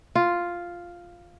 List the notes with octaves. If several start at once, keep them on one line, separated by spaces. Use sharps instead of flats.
F4